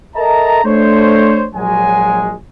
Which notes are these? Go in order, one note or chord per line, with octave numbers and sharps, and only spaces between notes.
A4 A#4 D#5 E5 A5 A#5
A3 D4 C5 C#5
A#1 F#3 G#3 G#5